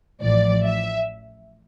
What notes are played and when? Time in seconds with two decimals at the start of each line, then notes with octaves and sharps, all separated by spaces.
0.22 A1 A2 F3 D5
0.64 E5